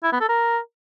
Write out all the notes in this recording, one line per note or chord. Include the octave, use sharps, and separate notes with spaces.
E4
B3
A4
A#4